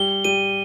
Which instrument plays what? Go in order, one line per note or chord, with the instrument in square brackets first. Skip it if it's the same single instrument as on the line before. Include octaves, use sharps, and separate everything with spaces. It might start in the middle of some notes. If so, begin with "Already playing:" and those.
Already playing: [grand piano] G3 [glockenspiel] G7
[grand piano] G3 [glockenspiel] D#7